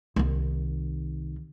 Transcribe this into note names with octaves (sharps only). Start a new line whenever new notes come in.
C2 D#3